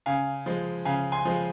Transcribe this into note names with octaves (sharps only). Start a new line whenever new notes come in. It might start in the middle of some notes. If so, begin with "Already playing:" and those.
C#3 F5 G#5
F3 G#3
C#3 F5 G#5
G#5 C6
F3 G#3